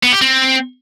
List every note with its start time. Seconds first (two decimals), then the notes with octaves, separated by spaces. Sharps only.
0.03 B3
0.12 G4
0.22 C4